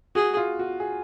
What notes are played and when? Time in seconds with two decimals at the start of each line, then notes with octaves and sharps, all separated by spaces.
0.15 F#4 G#4
0.37 F4
0.59 F#4
0.80 G#4